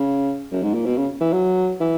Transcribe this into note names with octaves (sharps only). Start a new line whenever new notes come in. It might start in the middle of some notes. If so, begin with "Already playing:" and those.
Already playing: C#3
F#2
G#2
A#2
B2
C#3
E3
F#3
E3